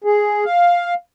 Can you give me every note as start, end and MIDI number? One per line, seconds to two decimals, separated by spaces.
0.04 0.44 68
0.44 0.94 77